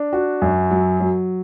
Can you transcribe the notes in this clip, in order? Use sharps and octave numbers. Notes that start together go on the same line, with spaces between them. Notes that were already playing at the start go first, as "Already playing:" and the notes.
Already playing: D4
F#4
F#2
F#3
F#3